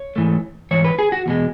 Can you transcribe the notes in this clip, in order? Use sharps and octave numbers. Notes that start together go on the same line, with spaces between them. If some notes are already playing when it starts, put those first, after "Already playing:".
Already playing: C#5
G#2 E3 A3
G#2 E3 C#5
B4
G#4
F#4
E2 B2 G#3